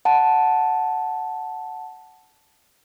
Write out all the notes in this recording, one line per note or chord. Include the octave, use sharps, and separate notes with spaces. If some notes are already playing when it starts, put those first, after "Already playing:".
F#5 A5